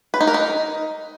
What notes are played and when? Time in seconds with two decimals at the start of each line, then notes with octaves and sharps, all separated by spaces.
0.14 B4
0.21 D#4
0.27 A#4
0.34 D#4